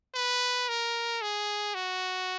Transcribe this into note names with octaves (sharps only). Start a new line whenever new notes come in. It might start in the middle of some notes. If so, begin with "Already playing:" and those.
B4
A#4
G#4
F#4